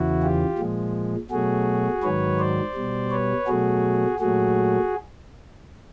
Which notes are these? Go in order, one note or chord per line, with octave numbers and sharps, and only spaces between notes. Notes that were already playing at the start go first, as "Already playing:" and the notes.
Already playing: E2 C#3 E3 E4 F#4
F4 G4
A#2 F3 G#3
B2 F#3 A3 F#4 G#4
G#2 D#3 F#3 B4 C#5
C5 D5
B2 G3
B4 C#5
B2 F#3 A3 F#4 G#4
A#2 F#3 A3 F#4 G#4